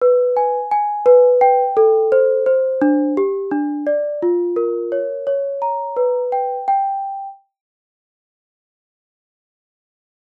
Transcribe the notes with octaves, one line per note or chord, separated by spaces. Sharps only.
B4
G#5
G#5
B4
G5
A4
C5
C5
D4
G4
D4
D5
F4
A#4
C#5
C#5
A#5
B4
G5
G5